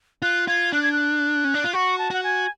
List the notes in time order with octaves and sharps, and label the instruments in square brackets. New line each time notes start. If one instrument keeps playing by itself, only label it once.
[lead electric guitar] F4 [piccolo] F#6
[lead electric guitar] F4 [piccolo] G#6
[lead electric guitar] D4 [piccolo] F#6
[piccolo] G#6
F#6
[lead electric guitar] C#4
D4
F4
[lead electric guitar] F#4 [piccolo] C#6
[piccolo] A5
[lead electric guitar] F#4 [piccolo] F#5
[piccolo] G#5